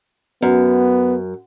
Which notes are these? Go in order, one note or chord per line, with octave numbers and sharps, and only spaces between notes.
F#2 B3